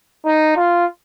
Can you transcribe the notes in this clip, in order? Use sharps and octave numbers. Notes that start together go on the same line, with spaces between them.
D#4
F4